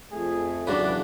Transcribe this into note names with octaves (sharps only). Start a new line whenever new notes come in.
F2 A3 G#4
E2 C#3 F#3 D4 F#4 B4 D5